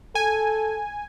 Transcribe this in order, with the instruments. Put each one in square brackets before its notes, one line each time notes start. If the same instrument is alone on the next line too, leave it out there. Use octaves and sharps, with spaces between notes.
[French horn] A4 [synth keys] G#5